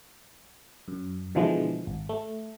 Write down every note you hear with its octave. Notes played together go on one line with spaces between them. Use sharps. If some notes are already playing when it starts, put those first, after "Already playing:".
F#2
B2 D3 E3 F3 G#3
G#1
A3